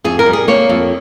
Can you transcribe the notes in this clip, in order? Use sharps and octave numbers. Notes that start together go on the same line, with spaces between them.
F2 G#4
A#4
G3
G#4
A#3 C#5
F2